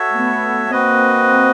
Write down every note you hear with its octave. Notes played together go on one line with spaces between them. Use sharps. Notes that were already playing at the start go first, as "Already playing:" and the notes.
Already playing: F#4 A4 C#5 E5
A3 B3
A#3 C4 F#4 B4 D#5